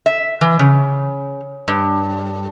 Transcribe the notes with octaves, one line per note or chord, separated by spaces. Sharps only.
E5
E3
C#3
G2